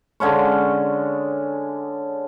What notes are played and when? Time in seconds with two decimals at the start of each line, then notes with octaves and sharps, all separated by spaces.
0.20 D3 G#3 C#4 C#6